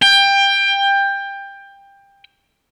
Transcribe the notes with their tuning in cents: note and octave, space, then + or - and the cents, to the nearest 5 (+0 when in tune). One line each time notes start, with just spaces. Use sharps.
G5 +20